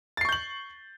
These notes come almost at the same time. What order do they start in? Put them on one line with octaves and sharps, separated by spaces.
A6 C7 C#6 G6 F#7